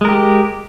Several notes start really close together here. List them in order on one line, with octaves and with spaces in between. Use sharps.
G#3 A#4 G4